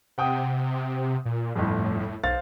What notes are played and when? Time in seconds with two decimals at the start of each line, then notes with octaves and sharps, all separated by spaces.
0.18 C3 F#5 G5 D#6
1.25 A#2
1.56 G1 F2 A2
2.23 B1 C5 F5 A6